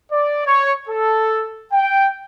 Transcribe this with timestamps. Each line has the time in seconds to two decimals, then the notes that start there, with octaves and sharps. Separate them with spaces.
0.11 D5
0.46 C#5
0.88 A4
1.72 G5